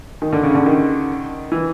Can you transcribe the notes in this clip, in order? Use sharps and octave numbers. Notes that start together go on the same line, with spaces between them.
D#3
D3
C#3
D3
D#3
E3